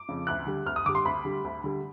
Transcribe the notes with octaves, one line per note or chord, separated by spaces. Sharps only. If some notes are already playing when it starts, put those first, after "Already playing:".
Already playing: D6
F2 C#3
D2 F#6
D3 G3
D2 F6
D#6
D3 G3 D6
C6
D2 B5
D3 G3
D2
D3 G3